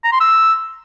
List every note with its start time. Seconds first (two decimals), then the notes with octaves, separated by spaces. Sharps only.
0.04 A#5
0.12 C6
0.20 E6